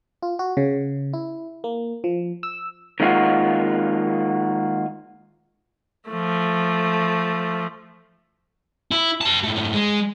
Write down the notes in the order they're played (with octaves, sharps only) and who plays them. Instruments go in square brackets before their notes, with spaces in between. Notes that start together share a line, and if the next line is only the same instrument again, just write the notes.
[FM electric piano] F4
F#4
C#3
E4
A#3
F3
E6
[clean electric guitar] D#3 G#3 A#3 F4 F#4
[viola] F3 A3
[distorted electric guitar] E4
G4 A5
G#2 A3
G#3